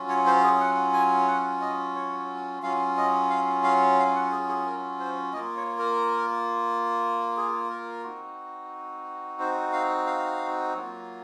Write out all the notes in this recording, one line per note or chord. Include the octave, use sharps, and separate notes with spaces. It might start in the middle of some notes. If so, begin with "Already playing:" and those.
Already playing: F#3 C#4 F4
C#5
C5
G#4
F#5
G#5
F#5
D#5
C#5
F#3 C#4 F4 F5
D#5
F5
F5
F5
F#5
G#4
G#4
A#4
C5
A#3 F4 D#5
C#5
A#4
G#4
A#4
C4 D#4 F#4
C5
F5
F5
F#3 A#3 F4